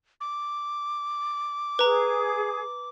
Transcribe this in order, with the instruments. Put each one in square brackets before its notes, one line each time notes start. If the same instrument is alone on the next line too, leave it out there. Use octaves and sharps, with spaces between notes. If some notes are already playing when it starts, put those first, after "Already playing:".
[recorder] D6
[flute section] G#4 [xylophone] B4 A#5